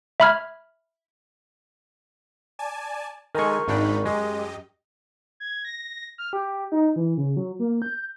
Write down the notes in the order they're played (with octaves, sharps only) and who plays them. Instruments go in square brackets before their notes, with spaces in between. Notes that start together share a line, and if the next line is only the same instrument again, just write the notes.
[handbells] E5 B5 F6 G#6
[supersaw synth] D5 G#5 A5
[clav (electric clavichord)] D#3 G#3 [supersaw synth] A4 G#5 [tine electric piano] A#4 A#5 C#6
[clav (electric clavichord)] G#1 D4 G5 [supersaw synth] G#2 D#4 B5
[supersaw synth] F#2 G4 D#5 [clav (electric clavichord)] G#3
[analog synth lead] G#6
A#6
F6
G4
D#4
E3
C#3
F#3
A#3
G6